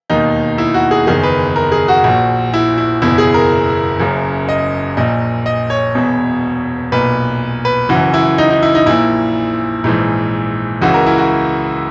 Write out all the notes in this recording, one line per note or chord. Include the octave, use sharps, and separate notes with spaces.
E1 D#2 D#3 D#4
E4
F#4
G#4
F#1 E2 D#3 G#4
B4
A#4
G#4
F#4
A#1 A#2
E4
E4
F#1 E2 B2 E4
G#4
A#4
F#1 F#2 C#3
D#5
A#1 A#2 D#5
D#5
C#5
E1 E2 B2
B1 A#2 B4
B4
F#1 F#2 E3 F#4
E4
D#4
D#4
E4
D#4
A#1 A#2 E4
A#1 G#2 E3
C#2 C#3 E3 F#4
A#4
E4
F#4